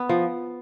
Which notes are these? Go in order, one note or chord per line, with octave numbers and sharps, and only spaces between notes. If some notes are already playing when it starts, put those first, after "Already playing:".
Already playing: B3
F3